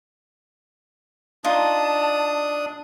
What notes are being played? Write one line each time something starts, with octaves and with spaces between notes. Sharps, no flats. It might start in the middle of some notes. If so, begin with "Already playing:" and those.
D4 D#4 F4 A5 D#6